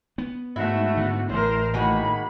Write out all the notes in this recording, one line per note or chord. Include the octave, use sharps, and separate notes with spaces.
B3
G#2 A3 E4 F#4
D3 B3
A1 A2 A#4 C5
D#3 G#3 A#3 F#4 B5